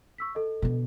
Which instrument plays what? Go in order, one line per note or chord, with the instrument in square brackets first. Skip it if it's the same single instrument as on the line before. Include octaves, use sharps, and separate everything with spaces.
[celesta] C#6 E6 B6
A4 D#5
[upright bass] B2 D3